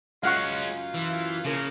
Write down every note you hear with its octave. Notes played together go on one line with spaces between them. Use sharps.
F#2 G#3 C#4 F4 F5 F#5 C#6
E3
C#3 F3 A#3 A#4